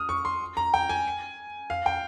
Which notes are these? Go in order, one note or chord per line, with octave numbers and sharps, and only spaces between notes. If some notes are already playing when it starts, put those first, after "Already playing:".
Already playing: D#6 F6
C#6
C6
A#5
G5
G#5
F5
G5